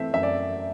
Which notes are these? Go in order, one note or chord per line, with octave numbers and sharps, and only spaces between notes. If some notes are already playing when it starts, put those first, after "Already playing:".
Already playing: E3 A3 C4 E5
F#2 E5
D5